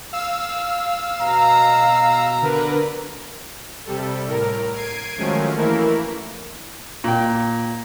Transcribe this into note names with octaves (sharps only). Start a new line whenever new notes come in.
F5 E6
B2 A#5
D3 A#4 B4
C3 G3 A4
A2 A#4
G#6 C7 D7 D#7
D#3 F3 F#3 G#3 A3 C#4
E3 A3 A#3 E4 A#4
A#2 G5